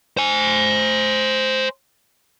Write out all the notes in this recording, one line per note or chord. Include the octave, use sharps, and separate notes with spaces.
C5 G#5